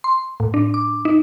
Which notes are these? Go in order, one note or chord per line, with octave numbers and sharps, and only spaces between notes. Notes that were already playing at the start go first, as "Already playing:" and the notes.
C6
A2
D4
D6
D#4